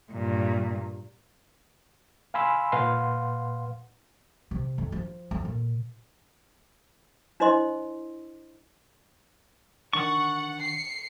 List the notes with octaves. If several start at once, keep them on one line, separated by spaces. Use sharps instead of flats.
G2 A#2
F5 G#5 B5 C6 E6
A#2 B4 F5 F#5 C6
C3
F2
F3
F2
A#2
D4 E4 C5 D#5 C6
D#3 D4 F#5 C#6 A6
C7 C#7